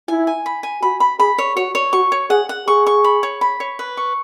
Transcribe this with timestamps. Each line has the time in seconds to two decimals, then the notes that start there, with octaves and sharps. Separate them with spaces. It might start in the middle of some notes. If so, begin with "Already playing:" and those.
0.08 E4 G#5
0.27 G#5
0.46 B5
0.63 G#5
0.82 F#4 B5
1.00 B5
1.19 G#4 B5
1.38 C#5
1.57 F#4 C#5
1.75 C#5
1.93 F#4 C#6
2.12 C#5
2.30 G#4 F#5
2.49 F#5
2.67 G#4 C#6
2.87 C#6
3.04 B5
3.23 C#5
3.41 B5
3.60 C#5
3.79 B4
3.97 C#6